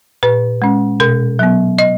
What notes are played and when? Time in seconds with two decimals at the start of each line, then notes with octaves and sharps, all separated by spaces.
0.23 A#2 B4
0.62 G#3 C#4
1.00 B2 A#4
1.39 F#3 B3
1.78 D#5